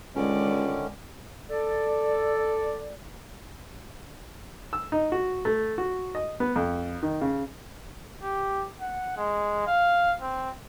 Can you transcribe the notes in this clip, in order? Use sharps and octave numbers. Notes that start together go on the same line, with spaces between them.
C#2 D3 D#3 G#3 C#4 D5
A4 D5
E6
D#4
F#4
A3
F#4
D#5
B3
F2
D#3
C#3
G4
F#5
G#3
F5
C4